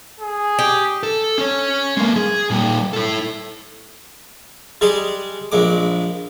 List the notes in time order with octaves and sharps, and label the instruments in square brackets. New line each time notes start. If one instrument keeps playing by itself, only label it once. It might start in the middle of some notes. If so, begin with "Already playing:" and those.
[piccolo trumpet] G#4
[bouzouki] G4
[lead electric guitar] A4
C#4 C#5
G#3 A#3
G#4
A#2 G3
E4 A4
[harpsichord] G3 G#3 G#4
A#1 G#3 D6